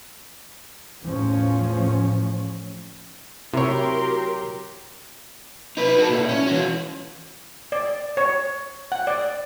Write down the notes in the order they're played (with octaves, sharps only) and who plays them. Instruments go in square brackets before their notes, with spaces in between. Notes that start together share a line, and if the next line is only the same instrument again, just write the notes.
[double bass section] E2 A2 F3 C#4
[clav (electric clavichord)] C3 C#5 [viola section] F#3 G4 C6 [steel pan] E4 [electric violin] A#4
[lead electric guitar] D#4 B4
F#4 A4
A#2 E4
C#4
E3 F#4
[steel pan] D5
C#5
F#5
D5